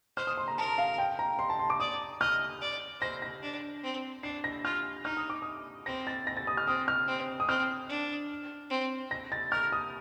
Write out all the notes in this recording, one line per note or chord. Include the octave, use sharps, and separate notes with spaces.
C5 F6
D#6
C6
A#5
A#4 A5
F5
G5
A#5
C6
A5
C6
D6
D5 D#6
D#5 F6
D5
C5 A#6
A#6
D4
C4
D4 C7
A#6
F4 F6
D#4 F6
D#6
D6
D#6
C4 A#6
A6
A#6
A6
D#6
F6
C4 D#6
F6
C4
D#6
C4 F6
D4
C4
A#6
A6
A#4 F6
D#6